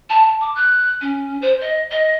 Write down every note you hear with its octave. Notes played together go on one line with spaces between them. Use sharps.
A5
D6
F#6
C#4
C5
D#5
D#5